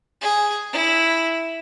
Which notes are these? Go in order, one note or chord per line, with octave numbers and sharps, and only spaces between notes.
G#4
E4